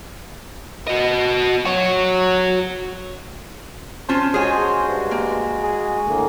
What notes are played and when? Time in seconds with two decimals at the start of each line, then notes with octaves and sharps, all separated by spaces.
0.88 F#4 D#5
1.65 F#4 C#5
4.09 C#4 F4 C5 A5
4.34 G#3 F#4 G#4 C#5 G#5
4.88 G2
5.11 A#3
5.64 G#4
6.05 A2 D3 A#3